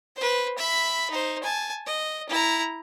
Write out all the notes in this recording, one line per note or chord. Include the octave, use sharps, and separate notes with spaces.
B4 C5
E5 B5
D#4 C5
G#5 A5
D#5
E4 A#5